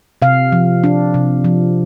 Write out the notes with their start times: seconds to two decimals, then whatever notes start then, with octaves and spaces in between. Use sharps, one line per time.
0.22 C3 F5
0.52 F3
0.84 D4
1.14 C3
1.44 F3